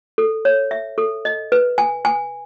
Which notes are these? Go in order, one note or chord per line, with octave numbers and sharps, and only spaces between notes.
A4
C#5
E5
A4
D#5
B4
G#5
G#5